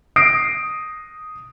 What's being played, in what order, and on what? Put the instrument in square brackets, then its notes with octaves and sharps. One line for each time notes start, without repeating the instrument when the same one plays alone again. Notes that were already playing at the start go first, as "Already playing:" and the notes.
[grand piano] D#6 A#6 C7 D7